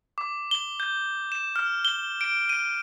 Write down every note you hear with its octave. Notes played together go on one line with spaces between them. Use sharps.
D6
G7
G6
E7
F6
G7
D7
D#7